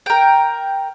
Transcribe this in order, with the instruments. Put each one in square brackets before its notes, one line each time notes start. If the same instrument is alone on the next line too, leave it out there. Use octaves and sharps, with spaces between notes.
[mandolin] A#4 G5